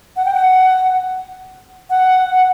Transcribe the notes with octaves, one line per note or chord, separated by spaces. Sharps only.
F#5
G5
F#5
F#5